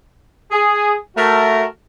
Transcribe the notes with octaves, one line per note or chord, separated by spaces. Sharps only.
G#4
A3 F#4 A#4